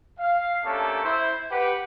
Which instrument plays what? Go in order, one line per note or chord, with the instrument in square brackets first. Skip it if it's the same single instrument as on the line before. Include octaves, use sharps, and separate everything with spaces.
[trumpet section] F5
A3 A#3 C#4 D4 G4 A4
E4 C5
G4 B4 F#5